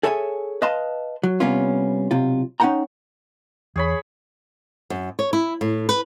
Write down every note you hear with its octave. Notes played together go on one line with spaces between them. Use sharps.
G#4 A4 C#5 E5 F#5 G#5
B4 D#5 F5 A5 C6
F#3
C3 G3 B3 C#4 F4
B1 C3 F4
C#4 D#4 F4 F#5 G5 A#5
E2 G#4 C#5 B5
F#2
C#5
E4
A2
B4